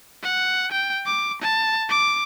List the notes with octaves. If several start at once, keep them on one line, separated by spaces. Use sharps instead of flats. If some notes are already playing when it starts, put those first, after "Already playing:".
F#5
G5
D6
A5
D6